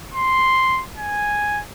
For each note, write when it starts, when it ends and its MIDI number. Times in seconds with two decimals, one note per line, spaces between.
0.14 0.83 84
0.98 1.61 80